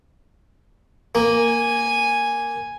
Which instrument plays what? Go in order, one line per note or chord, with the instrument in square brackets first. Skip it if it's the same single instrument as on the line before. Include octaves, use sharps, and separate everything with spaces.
[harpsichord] A#3 [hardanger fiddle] G#5